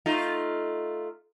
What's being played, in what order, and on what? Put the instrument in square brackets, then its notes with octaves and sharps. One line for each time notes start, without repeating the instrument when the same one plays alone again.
[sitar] A3 D#4 F4